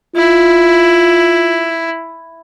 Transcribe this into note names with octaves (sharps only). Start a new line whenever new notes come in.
E4 F4